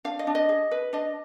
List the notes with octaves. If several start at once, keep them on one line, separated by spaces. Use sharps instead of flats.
D4 F5
D#5
D4
D#5
G#4
B4
D4 D#5